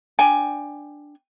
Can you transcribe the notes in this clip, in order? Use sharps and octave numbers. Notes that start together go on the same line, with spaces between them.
D4 G5 G#5